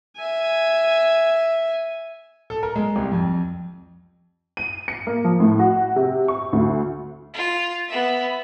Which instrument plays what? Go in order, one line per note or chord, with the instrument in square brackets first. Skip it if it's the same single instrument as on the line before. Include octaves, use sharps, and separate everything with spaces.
[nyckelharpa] E5 G#5
[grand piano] A4
A#4
G#3
C2
F2
[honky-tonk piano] D#7
C#7
A#3
F3
A2
F#4
C3
C#6
D2
[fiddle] F4
B3 E5